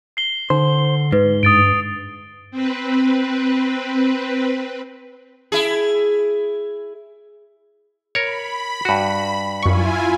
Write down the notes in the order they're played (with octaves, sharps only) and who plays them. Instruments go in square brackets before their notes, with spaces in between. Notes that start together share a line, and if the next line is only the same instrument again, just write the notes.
[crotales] C7 G7
[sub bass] D3 [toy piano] D#4 [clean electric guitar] C5
[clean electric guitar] G#2 [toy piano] B4
[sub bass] G2 [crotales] D#6 A6 D7
[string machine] C4 B4
[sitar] E4 G#4
[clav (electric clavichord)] A#4 C#5 [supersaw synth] B5
[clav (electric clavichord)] G2 F#4
[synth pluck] F#2 C#6 [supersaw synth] E4 F4 G#5